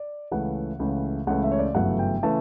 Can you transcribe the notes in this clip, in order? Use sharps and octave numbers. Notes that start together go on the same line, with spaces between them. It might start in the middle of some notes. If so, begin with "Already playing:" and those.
Already playing: D5
C#2 C#3 E3 A3 F#5
C#2 C#3 E3 A3
C#2 C#3 E3 A3 F#5
E5
C#5
D5
G1 F#2 C#3 E3 A3 F#5
G5
C#3 E3 A3 A5